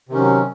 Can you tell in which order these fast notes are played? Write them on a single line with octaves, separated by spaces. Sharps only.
C3 D#3 C#4 F#3